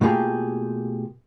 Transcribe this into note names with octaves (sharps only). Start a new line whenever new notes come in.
B2 A3 A#3 F4 G4 G#4